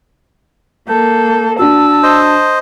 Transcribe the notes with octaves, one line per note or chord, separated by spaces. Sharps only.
A#3 A4 G6
D4 F#4 A5 E6
C5 D#5